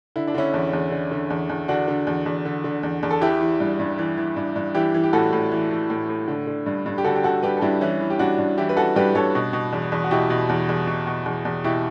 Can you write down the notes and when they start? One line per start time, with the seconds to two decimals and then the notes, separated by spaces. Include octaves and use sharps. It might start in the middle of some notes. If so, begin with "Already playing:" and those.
0.16 D3 E4
0.27 D4
0.35 D3 C#4 E4
0.54 E2
0.73 E2
0.92 D3
1.11 D3
1.30 E2
1.49 E2
1.68 D3 D4 F#4
1.88 D3
2.07 E2
2.26 E2
2.45 D3
2.64 D3
2.83 E2
3.03 E2
3.11 A4
3.21 E3 E4 G4
3.41 E3
3.60 G2
3.79 G2
3.98 E3
4.17 E3
4.36 G2
4.56 G2
4.74 E3 E4 G4
4.94 E3
5.03 G4
5.13 A2 F#4 A4
5.33 A2
5.52 E3
5.71 E3
5.90 A2
6.09 A2
6.28 D3
6.47 D3
6.66 G2
6.86 G2
6.98 G4
7.04 D3 F#4 A4
7.16 G4
7.24 D3 F#4 A4
7.43 G2 G4 B4
7.57 A4
7.61 G2 E4 G4
7.81 E3 C#4 E4
8.01 E3
8.10 G4
8.19 G2 D4 F#4
8.38 G2
8.58 E3 E4 G4
8.69 B4
8.77 E3 F#4 A4
8.96 G2 G4 B4
9.15 G2 A4 C#5
9.35 B2
9.53 B2
9.72 E2
9.92 E2
10.04 F#4
10.11 B2 E4 G4
10.30 B2
10.49 E2
10.69 E2
10.87 B2
11.07 B2
11.26 E2
11.45 E2
11.64 B2 E4 G4